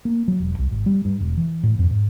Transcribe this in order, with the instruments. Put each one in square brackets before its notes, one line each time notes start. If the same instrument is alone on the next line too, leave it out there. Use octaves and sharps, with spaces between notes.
[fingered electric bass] A#3
F#3
E1
C2
G#1
G3
G2
E1
E3
A2
F2
G#2